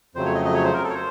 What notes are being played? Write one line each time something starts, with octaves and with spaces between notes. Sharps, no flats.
F2 C#3 F#3 A3 C5
C#5
D#5
D#5
C#5
C5
A#4
A4
C#5
C5